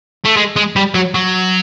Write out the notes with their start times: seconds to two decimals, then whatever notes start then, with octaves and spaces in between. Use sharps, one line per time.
0.25 A3
0.36 G#3
0.56 G#3
0.76 G3
0.95 F#3
1.15 F#3